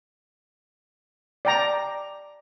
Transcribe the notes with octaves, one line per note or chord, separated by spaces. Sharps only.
D5 G5 A#5